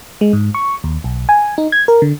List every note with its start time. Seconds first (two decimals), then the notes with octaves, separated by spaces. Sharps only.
0.21 G#3
0.33 G#2
0.54 C#6
0.84 D#2
1.04 B1
1.29 G#5
1.58 D#4
1.72 G#6
1.88 A#4
2.02 D3